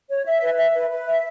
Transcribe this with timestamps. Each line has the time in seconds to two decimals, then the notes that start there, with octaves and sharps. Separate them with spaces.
0.08 C#5
0.25 E5
0.42 B4
0.58 E5
0.75 B4
0.90 B4
1.07 E5